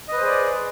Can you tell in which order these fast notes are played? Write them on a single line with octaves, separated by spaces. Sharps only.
D#5 B4 C5 G#4 D5